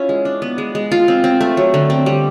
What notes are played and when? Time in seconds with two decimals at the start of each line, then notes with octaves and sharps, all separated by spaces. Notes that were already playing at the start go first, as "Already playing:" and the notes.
Already playing: C#4 E4 F4
0.09 G#3
0.25 D4
0.42 B3
0.58 G#3
0.75 G#3
0.92 F4
1.08 C4
1.24 C4
1.41 A3
1.57 F#3
1.74 D3
1.90 C4
2.06 G3